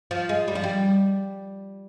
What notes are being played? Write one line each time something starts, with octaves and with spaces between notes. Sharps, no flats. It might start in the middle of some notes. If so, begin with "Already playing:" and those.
F3
G#3
G3
F3
G3